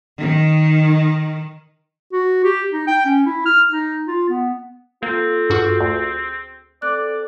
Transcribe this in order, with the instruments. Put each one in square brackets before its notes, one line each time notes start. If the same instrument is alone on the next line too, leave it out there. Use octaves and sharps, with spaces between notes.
[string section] D#3
[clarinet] F#4
G4
D#4
G5
C#4
E4
F6
D#4
F4
B3
[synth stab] A#3 [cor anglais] C4 [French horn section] F4 A4
[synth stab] G2 F#4 [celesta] G#4 F6
[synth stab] D2
[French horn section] C4 A4 [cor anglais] D5 [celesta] D6 F#6